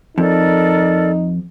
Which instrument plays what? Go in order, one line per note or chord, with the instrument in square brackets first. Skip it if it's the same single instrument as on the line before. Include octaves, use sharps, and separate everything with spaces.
[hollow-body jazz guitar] F2 [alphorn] D#4 [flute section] A4 A#4 D5